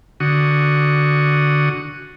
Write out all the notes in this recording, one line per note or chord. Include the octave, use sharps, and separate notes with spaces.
D3 F#4 C#6 D#6